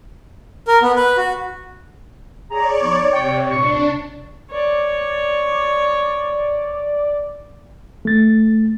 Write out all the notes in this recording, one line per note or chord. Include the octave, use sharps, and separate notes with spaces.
A#4
B3
B4
F#4
G#4 C#5 D5 A#5
F3 B3 D#4
C3 G5 C#6
C#2 A#2 D4 C#6
C#5 D5
A3 A6